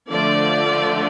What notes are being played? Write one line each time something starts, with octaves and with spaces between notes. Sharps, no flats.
D3 F3 A3 D5